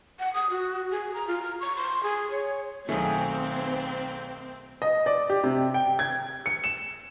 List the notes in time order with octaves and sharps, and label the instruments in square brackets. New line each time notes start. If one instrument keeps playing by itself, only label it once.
[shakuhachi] F#5
D#6
F#4
G#4
A#5
F4
A#5
C#6
C6
G#4
C#5
[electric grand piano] B1 D#3 [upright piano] A3 [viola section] C4 [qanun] G#4
[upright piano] D#5
D5
G4
C3
G5
G#6
C#7
E7